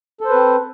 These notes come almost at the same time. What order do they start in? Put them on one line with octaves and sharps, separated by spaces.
A4 C5 B4 C4